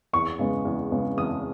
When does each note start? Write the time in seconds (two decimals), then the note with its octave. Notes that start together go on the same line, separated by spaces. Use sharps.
0.13 E2 C#6
0.39 C#3 G#3 B3
0.65 E2
0.91 C#3 G#3 B3
1.17 E2 D#6